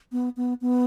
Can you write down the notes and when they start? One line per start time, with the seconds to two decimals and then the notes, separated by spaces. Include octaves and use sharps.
0.12 B3
0.37 B3
0.61 B3